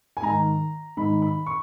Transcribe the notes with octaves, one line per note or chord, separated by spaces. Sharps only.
G#5
G#2 D#3 A#5
G#2 D#3 B5
B5
C#6